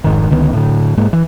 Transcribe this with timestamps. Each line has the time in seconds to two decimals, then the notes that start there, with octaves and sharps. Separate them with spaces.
0.04 F1 G#2 D#3
0.31 C#2 D3 D#3 B3
0.53 A2 D3
0.97 G#2 G#3 A#3
1.13 E3